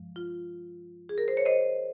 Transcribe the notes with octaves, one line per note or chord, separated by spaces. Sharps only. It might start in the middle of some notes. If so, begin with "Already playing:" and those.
Already playing: G2 F3 G#3
F4
G#4
A#4
C5
C#5
C5 D#5